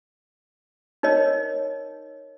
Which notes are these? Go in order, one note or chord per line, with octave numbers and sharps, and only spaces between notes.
D#4 A#4 C#5 D#5